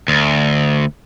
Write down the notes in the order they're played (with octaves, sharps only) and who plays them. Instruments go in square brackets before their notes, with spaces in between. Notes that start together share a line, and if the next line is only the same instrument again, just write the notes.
[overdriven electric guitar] D2